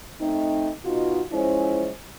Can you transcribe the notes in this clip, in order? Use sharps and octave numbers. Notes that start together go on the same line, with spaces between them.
A3 C4 D#4
B2 D#4 F4 F#4
F3 G#3 C#4 E4 C5